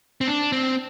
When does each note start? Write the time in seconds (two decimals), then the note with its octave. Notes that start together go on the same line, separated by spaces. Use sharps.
0.21 C4
0.28 D4
0.52 C4